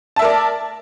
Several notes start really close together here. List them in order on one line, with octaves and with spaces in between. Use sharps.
A5 E5 A#4 D5